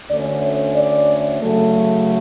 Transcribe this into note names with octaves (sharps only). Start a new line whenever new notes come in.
D2 D3 A3 C#4 D5
C#5
D5
C#3 F#3 A3